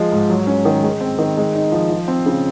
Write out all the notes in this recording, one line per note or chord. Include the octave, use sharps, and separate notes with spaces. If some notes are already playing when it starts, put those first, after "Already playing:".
Already playing: F3 G#3
G#2
F#3
C#4
D#3
G#3
C4
D#3
G#3
D#4
F3
F3
C4
C#3